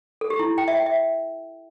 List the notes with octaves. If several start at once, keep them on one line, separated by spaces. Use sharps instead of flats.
A4
G4
E4
G5
E5
G5
E5